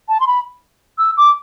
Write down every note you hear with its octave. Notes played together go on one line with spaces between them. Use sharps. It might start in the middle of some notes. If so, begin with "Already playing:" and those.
A5
C6
B5
E6
D6